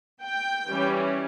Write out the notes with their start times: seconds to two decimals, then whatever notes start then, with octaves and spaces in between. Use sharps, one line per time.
0.23 G5
0.67 E3 G3 C#4